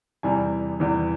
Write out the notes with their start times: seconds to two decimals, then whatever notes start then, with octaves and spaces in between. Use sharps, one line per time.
0.23 E2 C3 E3 G3 G#5
0.80 E2 C3 E3 G3